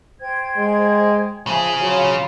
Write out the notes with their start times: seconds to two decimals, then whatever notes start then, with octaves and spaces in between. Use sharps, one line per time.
0.21 C5 G5 G#6
0.57 G#3
1.47 C#3 F3 G#4 E5
1.79 F#3 F4 C#6